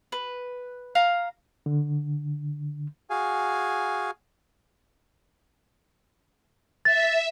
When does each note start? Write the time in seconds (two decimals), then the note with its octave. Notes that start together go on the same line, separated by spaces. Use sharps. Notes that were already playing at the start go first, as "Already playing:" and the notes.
0.12 B4
0.95 F5 A#5
1.66 D3
3.10 F#4 G#4 F5 G#5
6.85 E5 A6